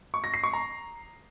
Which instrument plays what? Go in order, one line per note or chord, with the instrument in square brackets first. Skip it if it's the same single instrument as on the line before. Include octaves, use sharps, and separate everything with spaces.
[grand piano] C#6
A#6
C7
C#6
A#5